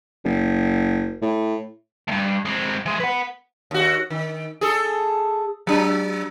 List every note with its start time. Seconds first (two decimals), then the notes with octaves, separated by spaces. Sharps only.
0.24 F#1
1.22 A2
2.08 D2 G2
2.45 G#3 C4
2.86 E3 G#3
3.00 B4 F#5
3.71 D#2 F#4
4.10 D#3
4.61 G#4 A4
5.67 F#3 D4